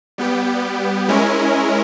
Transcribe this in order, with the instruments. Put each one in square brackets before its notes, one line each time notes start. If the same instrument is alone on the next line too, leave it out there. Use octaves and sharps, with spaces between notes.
[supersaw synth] G3 B3 G4
G#3 C#4 E4 A#4